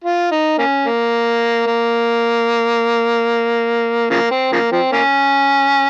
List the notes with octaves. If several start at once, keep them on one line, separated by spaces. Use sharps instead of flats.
F4
D#4
A#3 C#4
A#3
A#3
C#3 F3 A#3
C4
C#3 F3 A#3
F3 C4
A#3 C#4